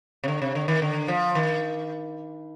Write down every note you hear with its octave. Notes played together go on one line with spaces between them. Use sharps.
C3
D3
C3
D3
D#3
D3
F3
D#3